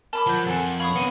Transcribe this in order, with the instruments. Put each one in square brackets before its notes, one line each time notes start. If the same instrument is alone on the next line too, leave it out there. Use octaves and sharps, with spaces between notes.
[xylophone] A#4 [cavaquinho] A5 B5 D6
[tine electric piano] F3 [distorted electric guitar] F#3 [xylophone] G6 G7
[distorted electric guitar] F2 [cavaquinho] A4 G#5 [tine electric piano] F#5
[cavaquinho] C#5 [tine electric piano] F5 [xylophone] B5 C#6 D#6
[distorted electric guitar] D3 C4 [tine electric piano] B3 [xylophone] C#7 D#7